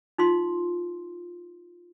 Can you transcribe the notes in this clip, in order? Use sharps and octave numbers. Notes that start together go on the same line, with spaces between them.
D#4 F4 C6